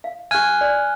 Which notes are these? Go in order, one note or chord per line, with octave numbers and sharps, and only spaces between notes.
F5
G4 F5 G#5 F6 F#6
D5